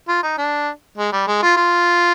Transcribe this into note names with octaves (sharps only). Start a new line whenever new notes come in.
F4
D#4
D4
G#3
G3
G#3
F4
F4